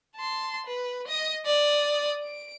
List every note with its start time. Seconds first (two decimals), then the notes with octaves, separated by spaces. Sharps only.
0.16 A5 C6
0.66 B4
1.08 D#5 D#6
1.46 D5 D#6
2.23 D7